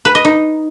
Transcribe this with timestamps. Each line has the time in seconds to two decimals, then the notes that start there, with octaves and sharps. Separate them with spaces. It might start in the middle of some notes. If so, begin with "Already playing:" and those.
0.05 B4
0.15 D#5
0.25 D#4